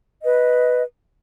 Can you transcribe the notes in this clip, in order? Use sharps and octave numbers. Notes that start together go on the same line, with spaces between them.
B4 D#5